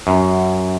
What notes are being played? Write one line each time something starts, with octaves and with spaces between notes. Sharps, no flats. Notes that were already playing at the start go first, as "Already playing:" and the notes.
F#2